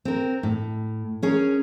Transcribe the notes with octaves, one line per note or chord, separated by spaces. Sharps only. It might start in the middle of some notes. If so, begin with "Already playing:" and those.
C4 A#4
A2
C#4 G#4 A#4